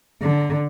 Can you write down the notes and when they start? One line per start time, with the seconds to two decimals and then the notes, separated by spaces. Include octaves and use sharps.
0.22 D3